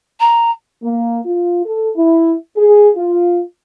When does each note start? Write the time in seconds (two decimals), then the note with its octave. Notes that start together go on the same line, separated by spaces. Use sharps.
0.20 A#5
0.82 A#3
1.25 F4
1.64 A4
1.96 E4
2.56 G#4
2.96 F4